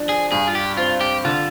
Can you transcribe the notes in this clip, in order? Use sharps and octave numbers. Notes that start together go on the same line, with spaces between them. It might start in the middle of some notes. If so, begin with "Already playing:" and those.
Already playing: F3 D4
G#4
G2 G#4
F4
G4
C4 F4
G4
D3 F4